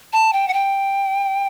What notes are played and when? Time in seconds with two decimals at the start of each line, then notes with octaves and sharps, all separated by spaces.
0.13 A5
0.33 G5
0.48 F#5
0.53 G5